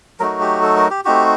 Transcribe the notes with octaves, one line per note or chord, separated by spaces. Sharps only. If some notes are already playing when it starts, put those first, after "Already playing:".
F#3 A3 D#4 F#4 A#4
G4
A4
A#4
G4
A3 C4 D#4 F#4 G4